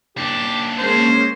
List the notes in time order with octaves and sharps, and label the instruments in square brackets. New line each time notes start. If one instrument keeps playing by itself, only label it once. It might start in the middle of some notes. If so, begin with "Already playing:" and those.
[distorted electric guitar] D#2 D4 [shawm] G4
[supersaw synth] G#3 A#3 C#4 [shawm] C5